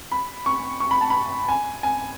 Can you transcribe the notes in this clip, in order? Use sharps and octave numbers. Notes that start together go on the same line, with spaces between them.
B5
C#6
C#6
B5
A5
B5
G#5
G#5